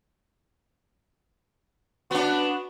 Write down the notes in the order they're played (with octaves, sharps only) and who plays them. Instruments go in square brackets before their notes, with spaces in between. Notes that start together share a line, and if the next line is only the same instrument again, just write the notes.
[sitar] B3 D4 [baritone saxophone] F#4